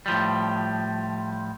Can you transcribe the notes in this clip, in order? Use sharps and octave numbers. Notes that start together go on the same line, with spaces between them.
A2 F3 G3